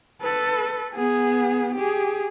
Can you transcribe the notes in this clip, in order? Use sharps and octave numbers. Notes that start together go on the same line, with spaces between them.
A4 B4
B3 G#4
G4 G#4